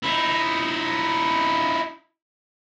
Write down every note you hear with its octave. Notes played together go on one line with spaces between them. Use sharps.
D#4 E4